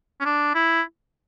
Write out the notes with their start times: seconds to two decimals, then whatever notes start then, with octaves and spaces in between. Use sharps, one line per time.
0.20 C#4
0.25 D4
0.55 E4